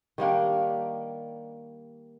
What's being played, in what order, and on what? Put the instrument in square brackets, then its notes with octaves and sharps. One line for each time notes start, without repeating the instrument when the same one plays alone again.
[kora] D#3 G3 A#3 D4